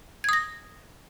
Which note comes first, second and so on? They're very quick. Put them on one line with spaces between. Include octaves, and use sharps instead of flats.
G#6 D#6 A#6